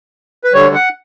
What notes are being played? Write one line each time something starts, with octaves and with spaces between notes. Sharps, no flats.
B4
D2 D3 G3 C#5
F#5